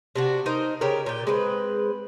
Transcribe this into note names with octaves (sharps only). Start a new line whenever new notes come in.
C3 D4 F#4
D#4 A#4 C5
C#3 G4 A#4
A#2 G4
G#3 C4 B4